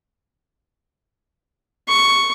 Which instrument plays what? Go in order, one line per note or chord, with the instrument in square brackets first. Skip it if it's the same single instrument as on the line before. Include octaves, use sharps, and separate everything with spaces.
[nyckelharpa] C#6